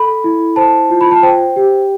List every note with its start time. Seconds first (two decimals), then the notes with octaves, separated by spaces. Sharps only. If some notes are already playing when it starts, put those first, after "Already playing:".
Already playing: A4 B5
0.24 E4
0.56 C5 A5
0.90 F4
1.01 B5
1.11 A5
1.23 C5 G5
1.56 G4